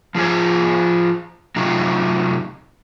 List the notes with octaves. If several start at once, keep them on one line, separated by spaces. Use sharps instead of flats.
F3 F4 G#4 C5 G#5
C3 F#3 A3 D#4 F4